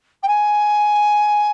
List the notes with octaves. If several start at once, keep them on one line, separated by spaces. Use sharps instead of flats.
G5
G#5